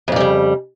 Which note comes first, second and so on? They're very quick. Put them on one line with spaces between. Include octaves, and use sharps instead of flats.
F2 A#2 G3 C#3